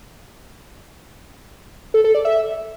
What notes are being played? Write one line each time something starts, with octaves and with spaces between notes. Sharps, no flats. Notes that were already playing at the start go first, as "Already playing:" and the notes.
A4
A4
D5
E5